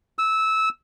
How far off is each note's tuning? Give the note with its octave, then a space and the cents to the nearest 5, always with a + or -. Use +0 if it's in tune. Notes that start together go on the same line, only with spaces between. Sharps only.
E6 -15